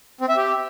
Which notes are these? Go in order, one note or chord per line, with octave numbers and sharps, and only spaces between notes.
C4
E5
G4